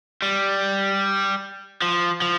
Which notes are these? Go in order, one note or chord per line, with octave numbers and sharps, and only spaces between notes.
G3
F3
F3